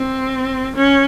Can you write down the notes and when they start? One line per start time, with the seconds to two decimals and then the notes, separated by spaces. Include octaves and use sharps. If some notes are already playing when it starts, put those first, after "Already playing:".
Already playing: C4
0.76 C#4